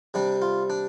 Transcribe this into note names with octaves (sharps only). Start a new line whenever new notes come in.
C3 G3 D4
F4
D4